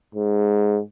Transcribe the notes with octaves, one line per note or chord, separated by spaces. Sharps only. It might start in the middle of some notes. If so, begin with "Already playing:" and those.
G#2